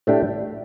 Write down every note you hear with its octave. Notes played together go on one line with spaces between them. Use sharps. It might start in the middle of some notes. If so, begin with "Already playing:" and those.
A2 A3 D4 G4